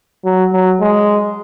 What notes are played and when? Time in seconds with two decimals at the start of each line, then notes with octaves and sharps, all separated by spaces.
0.24 F#3
0.53 F#3
0.80 G#3